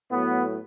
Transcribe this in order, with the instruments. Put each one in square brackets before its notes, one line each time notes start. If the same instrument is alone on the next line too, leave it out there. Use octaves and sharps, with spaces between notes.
[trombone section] A2 F#3 B3